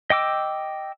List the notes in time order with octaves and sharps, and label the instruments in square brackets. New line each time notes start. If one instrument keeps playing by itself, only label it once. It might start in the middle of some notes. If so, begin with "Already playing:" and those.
[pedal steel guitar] D#5 G5 D6 E6